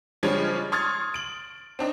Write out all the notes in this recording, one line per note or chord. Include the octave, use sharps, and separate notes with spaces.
C#3 F3 G3 G#3 C#4 D4
C6 C#6 D#6 F6 G#6 A6
D7 F#7
C4 D4 D#4